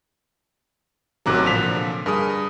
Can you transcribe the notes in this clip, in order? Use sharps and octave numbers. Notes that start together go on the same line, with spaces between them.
A1 C3 F#3 A#5 D6 F#6
A#2 D3 F3 B6 F7
G2 G#4 A#4 D#6